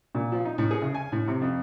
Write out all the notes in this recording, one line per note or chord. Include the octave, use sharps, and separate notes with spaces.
A#2
F3
D#4
A2
G#4
C#3
G#5
A2
C3
F2